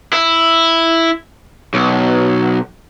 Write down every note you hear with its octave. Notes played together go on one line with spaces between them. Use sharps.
E4
B1